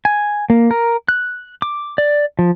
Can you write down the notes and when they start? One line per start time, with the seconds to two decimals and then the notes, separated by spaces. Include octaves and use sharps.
0.05 G#5
0.50 A#3
0.71 A#4
1.09 F#6
1.62 D6
1.98 D5
2.39 F3